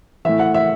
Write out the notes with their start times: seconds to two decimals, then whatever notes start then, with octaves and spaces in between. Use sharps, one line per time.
0.25 A2 E3 E5
0.39 F#5
0.54 E5